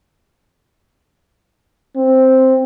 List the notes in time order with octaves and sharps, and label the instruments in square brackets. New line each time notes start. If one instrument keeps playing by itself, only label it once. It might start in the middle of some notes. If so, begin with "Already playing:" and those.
[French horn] C4